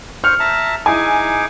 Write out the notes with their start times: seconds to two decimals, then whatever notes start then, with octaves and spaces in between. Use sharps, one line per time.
0.24 C5 C#6 F6
0.40 E5 A5 A#5
0.86 D#4 E4 G#4 G#5 D6